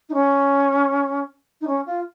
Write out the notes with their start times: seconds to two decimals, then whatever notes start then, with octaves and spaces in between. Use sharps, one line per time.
0.09 D#4
0.14 C#4
1.61 D#4
1.67 C#4
1.86 F4